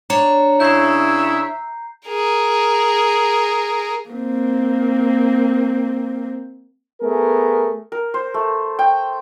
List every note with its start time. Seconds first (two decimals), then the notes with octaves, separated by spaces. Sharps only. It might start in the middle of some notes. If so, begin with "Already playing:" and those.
0.10 D4 C#5 A#5
0.60 C#3 E4 E5 G6 C7
2.08 G#4 A#4
4.09 A#3 C4
7.01 A3 B3 G#4 A#4
7.92 A#4
8.14 C5
8.34 A3
8.79 G5